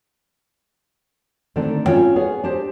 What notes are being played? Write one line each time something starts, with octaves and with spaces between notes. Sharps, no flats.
D3 D#3 A3 C4 D4
C4 C#4 F4 C#5 G5
B3 G#4 C#5 G#5
D4 G4 C5